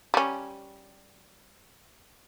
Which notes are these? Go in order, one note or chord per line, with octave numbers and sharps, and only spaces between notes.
G3 C#4